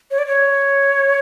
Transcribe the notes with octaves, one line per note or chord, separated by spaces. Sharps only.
C#5
D5
C#5